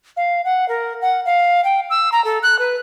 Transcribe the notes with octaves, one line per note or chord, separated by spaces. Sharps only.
F5
F#5
A#4
F#5
F5
G5
E6
A#5
A4
F#6
B4